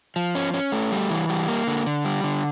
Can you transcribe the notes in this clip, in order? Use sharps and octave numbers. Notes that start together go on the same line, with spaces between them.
F3
C#4
C#4
A3
G3
E3
G3
A#3
D3
D3
G3
D3